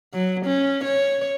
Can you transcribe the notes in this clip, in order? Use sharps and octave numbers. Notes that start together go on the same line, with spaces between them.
F#3
C#4
C#5